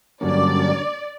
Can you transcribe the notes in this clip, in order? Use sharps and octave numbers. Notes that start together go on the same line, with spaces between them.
G2 D3 F#3 A#3 C#4 D5